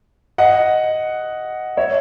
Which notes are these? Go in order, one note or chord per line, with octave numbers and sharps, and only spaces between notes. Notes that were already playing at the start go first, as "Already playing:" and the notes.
D#5 F#5
C#5 E5